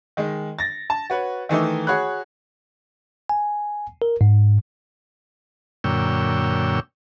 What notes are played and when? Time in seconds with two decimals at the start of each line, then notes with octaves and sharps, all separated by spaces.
0.17 D#3 G#3
0.59 A6 A#6
0.90 A5
1.10 F#4 B4 C#5
1.49 D#3 E3 A3 D#4
1.87 F#4 G#4 C#5 B5 F#6
3.29 G#5
4.02 A#4
4.21 G#2
5.84 F#2 A#2 D3 C#5 G5 E6